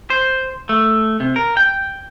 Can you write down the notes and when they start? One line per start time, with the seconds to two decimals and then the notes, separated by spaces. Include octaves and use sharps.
0.10 C5
0.69 A3
1.20 C3
1.36 A#4
1.57 G5